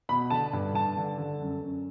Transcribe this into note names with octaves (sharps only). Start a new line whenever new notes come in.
B2 B5
D3 A5
G2
G2 A5
D3
D3
F#2
F#2